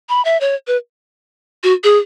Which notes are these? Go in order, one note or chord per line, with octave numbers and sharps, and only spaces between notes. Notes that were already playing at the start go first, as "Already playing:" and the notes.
B5
E5
C#5
B4
F#4
G#4